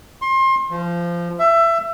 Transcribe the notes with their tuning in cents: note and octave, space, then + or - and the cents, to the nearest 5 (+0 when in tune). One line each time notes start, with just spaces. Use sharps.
C6 +30
F3 -20
E5 +20